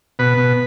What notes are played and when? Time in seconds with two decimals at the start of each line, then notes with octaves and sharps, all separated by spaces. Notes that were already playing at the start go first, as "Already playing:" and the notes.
0.19 B2 B4
0.38 B2